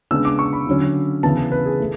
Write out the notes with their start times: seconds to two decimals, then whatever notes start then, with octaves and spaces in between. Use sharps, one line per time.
0.11 C#3 G#3 B3 D4 E6
0.25 D6
0.39 C#6
0.53 B5
0.67 D3 F#3 C#4
1.23 C#3 E3 B3 A5
1.38 B4
1.52 B4
1.66 G#4
1.80 A3